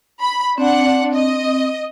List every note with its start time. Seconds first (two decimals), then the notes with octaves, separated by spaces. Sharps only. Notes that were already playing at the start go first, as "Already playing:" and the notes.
0.22 B5
0.58 C4 D4 F#5
1.14 D#5